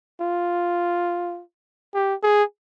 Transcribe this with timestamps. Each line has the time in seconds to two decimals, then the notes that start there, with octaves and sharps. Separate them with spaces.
0.21 F4
1.94 G4
2.23 G#4